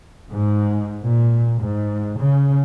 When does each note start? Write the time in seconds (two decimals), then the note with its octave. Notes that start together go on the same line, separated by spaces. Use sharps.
0.29 G#2
1.02 A#2
1.62 G#2
2.20 C#3